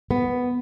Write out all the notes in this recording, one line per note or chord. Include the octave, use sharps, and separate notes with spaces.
B3